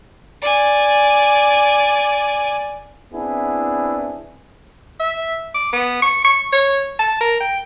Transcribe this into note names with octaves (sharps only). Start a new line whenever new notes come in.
D5 G#5
B3 C4 D4 E4 G#4
E5
D6
B3
C#6
C#6
C#5
A5
A#4
G5